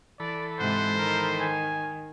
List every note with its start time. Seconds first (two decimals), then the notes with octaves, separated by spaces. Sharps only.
0.20 E3 A4 D5 B5
0.59 G#2 C3 G#3 C5 F#5
0.98 D#3 A#4
1.40 G#5